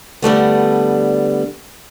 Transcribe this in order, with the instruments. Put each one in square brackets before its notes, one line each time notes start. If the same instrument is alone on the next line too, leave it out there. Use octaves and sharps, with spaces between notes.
[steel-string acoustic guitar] D3 G3 A3 B3